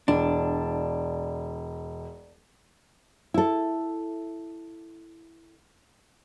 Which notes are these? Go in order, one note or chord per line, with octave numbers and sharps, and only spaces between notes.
E1 D4
E4 A4